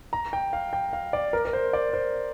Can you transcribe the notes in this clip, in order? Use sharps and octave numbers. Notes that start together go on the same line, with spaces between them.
A#5
G5
F5
G5
F5
D5
A#4
A#4
C5
D5
C5